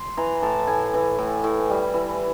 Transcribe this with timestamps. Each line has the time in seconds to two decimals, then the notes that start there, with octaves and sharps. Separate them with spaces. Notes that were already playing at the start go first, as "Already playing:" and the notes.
Already playing: C6
0.17 E3 A#5
0.42 A2 A5
0.67 A2 G#5
0.94 E3
1.19 A2
1.44 A2
1.69 G3
1.94 E3